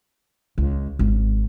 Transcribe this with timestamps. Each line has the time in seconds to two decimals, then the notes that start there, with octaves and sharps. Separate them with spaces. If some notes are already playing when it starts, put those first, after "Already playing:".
0.58 C#2
0.99 G#1